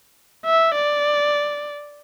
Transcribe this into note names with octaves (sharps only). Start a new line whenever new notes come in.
E5
D5